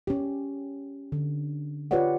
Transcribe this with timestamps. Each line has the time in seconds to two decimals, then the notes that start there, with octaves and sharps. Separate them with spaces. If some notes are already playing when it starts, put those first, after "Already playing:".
0.07 C#4 G4
1.12 D3
1.91 F4 G4 B4 C#5 D5 F#5